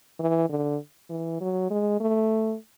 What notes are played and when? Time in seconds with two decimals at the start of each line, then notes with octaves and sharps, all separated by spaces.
0.19 E3
0.49 D3
1.10 E3
1.41 F#3
1.70 G#3
2.00 A3